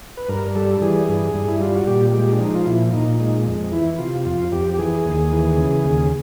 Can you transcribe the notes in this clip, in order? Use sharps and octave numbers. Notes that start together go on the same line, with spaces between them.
B4
G2 A#4
G3 A4
E3 G#4
G2
G2
E4
G3 F4
F#4
A#2 G4
G#3 G4
D4
F3 D#4
F4
A#2 E4
A#2 D#4
G#3 D#4
F2
E3 E4
C3 F4
F2 F4
F2 G4
G4
E3 G#4
D#2
E3
C#3
D#2